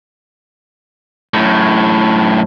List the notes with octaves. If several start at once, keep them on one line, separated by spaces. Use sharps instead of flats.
F#2 A2